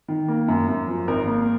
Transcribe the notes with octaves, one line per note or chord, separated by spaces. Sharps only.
D#3
A#3
F#2
F#2
F3
G#1 A#4
A#3